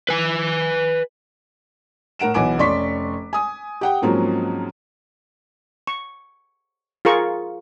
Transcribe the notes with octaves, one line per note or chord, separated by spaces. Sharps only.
B4 G#5
A2 A#4 F#5 D7 E7
B1 E3 F#5 G#5 D6 D7
F1 C#4 D5 C6 C#6 B6
G#5 D#6
G4 F#5 G5
G#2 F3 F#3 A#3 C4 C#4
C#6
F4 G#4 A#4 C#6